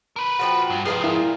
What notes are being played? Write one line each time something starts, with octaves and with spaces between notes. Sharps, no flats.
A#4 B4
A#2 F3 F#4 G5
G2
E2 G#2 F3 G#4 F5 G5
A#2 E4